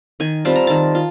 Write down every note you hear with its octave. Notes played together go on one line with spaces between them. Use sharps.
D#3 G#5
G3 C4 F4 A5
A#5
D#3 A5
F4